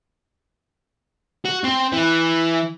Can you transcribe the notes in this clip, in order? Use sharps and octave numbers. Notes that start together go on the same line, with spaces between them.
F#4
C4
E3